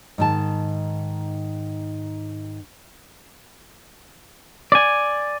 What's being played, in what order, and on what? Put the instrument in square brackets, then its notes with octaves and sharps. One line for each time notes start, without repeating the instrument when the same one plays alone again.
[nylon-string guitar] G#2 D#3 A5
[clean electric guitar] D5 G#5